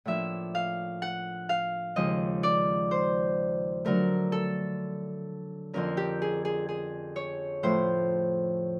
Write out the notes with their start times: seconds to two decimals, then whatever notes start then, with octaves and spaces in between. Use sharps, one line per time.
0.05 A2 F3 A#3 D4 E5
0.55 F5
1.02 F#5
1.49 F5
1.96 D#2 C#3 F3 G#3 D#5
2.43 D5
2.91 C5
3.85 D3 F#3 A3 A#4
4.32 A4
5.74 F2 D3 F3 A#3 C#4 A#4
5.97 G4
6.22 G#4
6.45 G#4
6.69 G#4
7.16 C#5
7.63 A2 F3 A3 C5